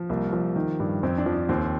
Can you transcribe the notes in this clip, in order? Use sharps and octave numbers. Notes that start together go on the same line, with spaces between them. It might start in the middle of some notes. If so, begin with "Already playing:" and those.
Already playing: F3
C2 A#3
F3
D#3
G2
F2 C4
D4
F3
D4
D#2 C4